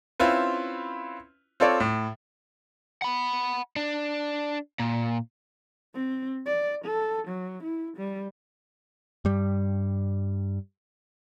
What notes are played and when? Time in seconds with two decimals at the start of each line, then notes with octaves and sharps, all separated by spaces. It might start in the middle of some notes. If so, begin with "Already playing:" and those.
0.20 C4 C#4 E4 F4 B4
1.60 C4 F4 A4 C#5 D5
1.80 A2
3.02 F#5 B5
3.76 D4
4.80 A#2
5.94 C4
6.46 D5
6.85 A4
7.28 F#3
7.64 E4
7.98 G3
9.25 G2 G3